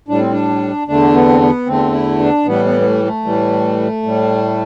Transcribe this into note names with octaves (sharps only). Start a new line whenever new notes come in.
A2 G3 D4
C4
D4
E2 D3 A3 D4
B3
C4
B3
E2 D3 A3 C4
E4
D4
A2 E3 G3 B3
B3
B3
A3
A3
A2 E3 G3
A2 G3